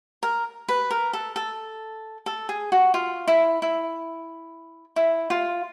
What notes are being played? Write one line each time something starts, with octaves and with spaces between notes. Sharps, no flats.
A#4
B4
A#4
A4
A4
A4
G#4
F#4
F4
E4
E4
E4
F4